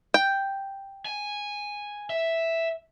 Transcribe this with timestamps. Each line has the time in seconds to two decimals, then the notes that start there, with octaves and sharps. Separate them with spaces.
0.14 G5
1.05 G#5
2.10 E5